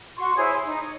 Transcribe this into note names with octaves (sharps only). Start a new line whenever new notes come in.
F#4 C6 C#6
E4 G#4 C5 C#5
C6
D#4
C#5